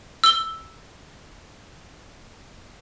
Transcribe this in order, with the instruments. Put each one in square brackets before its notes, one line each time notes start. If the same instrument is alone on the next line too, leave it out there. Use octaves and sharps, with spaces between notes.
[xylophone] E6 G7